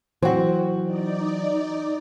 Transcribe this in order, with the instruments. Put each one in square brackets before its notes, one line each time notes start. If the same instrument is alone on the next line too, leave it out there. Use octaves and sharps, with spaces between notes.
[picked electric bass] E3 F#3 [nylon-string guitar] C4 F#4
[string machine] D#4 D5